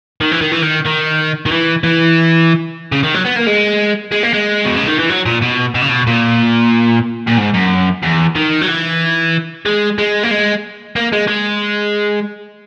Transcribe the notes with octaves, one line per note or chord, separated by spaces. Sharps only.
D#3
E3
D#3
E3
D#3
D#3
D#3
E3
E3
C#3
D#3
F#3
B3
A#3
G#3
G#3
A#3
G#3
B2
C#3
D#3
E3
F#3
A#2
B2
B2
C#3
B2
A#2
A#2
G#2
F#2
E2
D#3
F#3
E3
G#3
G#3
A#3
G#3
A#3
G#3
G#3